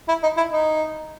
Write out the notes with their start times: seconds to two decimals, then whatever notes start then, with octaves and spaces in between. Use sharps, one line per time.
0.08 E4
0.23 D#4
0.37 E4
0.52 D#4